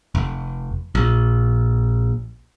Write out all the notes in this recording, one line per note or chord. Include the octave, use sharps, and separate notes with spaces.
F1
A#1